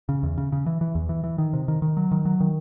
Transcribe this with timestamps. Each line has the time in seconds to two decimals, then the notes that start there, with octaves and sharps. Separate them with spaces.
0.09 C#3
0.23 E2
0.38 C#3
0.52 C#3
0.66 E3
0.81 E3
0.95 E2
1.09 E3
1.24 E3
1.38 D#3
1.53 C3
1.68 D#3
1.82 D#3
1.97 F#3
2.11 D#3
2.25 F#3
2.40 D#3